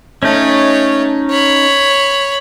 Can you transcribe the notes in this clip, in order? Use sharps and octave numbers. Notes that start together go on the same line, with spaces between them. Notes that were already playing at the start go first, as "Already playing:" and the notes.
A3 C#4 D#4 C#5
C#5 B5